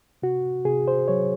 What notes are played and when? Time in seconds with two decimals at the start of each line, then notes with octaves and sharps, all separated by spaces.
0.22 C3 F#4
0.65 C3 G#4
0.88 C5
1.08 F#3 C#5